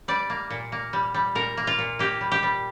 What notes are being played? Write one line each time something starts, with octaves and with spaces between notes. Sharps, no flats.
G3 D5
A#3
A#2
A#3
G3
G3
A#2 A#4
A#3
F4
A#2
A#3 G4
G3
G4
G3